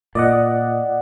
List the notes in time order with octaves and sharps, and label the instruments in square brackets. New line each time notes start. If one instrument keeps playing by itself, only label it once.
[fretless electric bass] A#2 [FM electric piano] D5 D#5 F#5